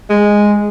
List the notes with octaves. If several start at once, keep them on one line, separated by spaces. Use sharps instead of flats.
G#3